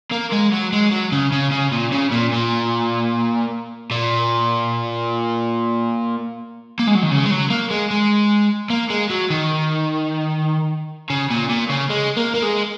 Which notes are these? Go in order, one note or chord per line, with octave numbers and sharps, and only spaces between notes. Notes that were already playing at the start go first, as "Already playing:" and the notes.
A#3
G#3
F#3
G#3
F#3
C#3
C#3
C#3
A#2
C#3
A#2
A#2
A#2
A#3
G#3
F#3
D#3
C#3
G#3
F#3
A#3
G#3
G#3
A#3
G#3
F#3
D#3
C#3
A#2
A#2
C#3
G#3
A#3
A#3
G#3